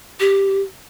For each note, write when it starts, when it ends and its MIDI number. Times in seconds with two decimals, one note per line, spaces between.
0.20 0.62 67